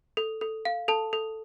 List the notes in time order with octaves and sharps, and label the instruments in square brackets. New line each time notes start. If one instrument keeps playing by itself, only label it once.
[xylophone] A4
A4
F5
A4 A5
A4